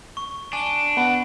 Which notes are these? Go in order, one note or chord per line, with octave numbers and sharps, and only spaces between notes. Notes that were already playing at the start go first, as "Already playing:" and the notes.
C#6
D4 G#5 D#7 G7
B3 F#5 A5